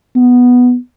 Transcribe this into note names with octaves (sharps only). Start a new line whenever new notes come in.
B3